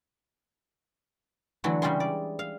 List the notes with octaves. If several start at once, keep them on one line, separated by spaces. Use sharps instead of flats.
D3 E3 F#3 A3
C#3 G3 G#3 G#4 C6
D5
F5